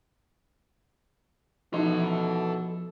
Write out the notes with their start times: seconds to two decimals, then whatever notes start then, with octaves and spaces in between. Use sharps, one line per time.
1.74 B2 F3 D#4 E4 A4 C6